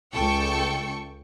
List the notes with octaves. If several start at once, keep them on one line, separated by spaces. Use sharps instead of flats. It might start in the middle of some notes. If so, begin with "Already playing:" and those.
C#2 A4 G5 C#6 C#7